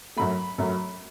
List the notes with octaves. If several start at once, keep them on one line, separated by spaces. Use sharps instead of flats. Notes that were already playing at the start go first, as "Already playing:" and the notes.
F#2 F#3 A3 B5
F#2 F#3 A3